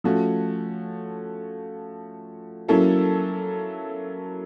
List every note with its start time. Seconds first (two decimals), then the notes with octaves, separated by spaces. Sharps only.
0.04 F3 A3 C#4 F#4
2.68 F#3 A#3 C#4 E4 A4